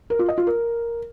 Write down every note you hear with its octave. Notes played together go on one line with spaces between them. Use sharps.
A#4
F4
D#5
F4
A#4